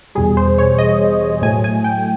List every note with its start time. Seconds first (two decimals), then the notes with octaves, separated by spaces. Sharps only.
0.15 E2 B2 G3 G#4
0.37 C5
0.58 C#5
0.78 D#5
1.42 A2 F#3 A3 G#5
1.64 G#5
1.84 G5